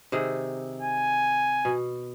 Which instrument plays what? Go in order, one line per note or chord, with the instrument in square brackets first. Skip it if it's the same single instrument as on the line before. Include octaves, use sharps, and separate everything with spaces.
[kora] C3 D#3 G#4
[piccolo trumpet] G#5
[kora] B2